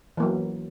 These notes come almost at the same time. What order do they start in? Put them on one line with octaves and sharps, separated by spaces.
E3 A#3 F#3